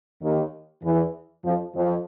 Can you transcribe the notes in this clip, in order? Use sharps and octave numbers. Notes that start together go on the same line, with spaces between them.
D#2 D#3
E2 E3
F2 F3
F2 F3